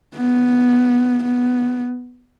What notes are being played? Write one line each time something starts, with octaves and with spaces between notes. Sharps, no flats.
B3
B3